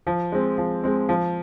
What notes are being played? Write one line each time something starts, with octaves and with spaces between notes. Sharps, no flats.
F3
G#3 C4
F3
G#3 C4
F3